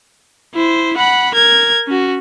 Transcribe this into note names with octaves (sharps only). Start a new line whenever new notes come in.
E4 C5
F#5 B5
A#4 G#6
C#4 F#4